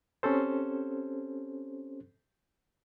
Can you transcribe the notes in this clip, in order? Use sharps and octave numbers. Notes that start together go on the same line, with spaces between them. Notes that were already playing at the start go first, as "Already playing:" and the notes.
C4 C#4 G4 A4 C5